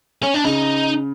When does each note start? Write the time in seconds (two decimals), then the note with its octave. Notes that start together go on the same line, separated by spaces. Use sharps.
0.23 C#4
0.34 D4
0.44 C#3 D#4